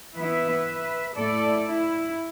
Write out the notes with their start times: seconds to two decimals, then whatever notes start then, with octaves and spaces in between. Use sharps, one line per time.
0.15 E3 B3 E4 B4 E5
1.16 A2 A3 E4 A4 D5
1.66 E4